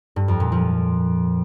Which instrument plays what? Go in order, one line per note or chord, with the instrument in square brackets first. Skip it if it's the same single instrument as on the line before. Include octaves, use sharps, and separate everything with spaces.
[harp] G2
F2
A#2
F3